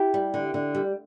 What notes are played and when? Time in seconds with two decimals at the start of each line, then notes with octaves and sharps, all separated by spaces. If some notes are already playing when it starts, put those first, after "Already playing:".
Already playing: E4 G4
0.14 G3
0.34 D3
0.54 D3
0.75 G3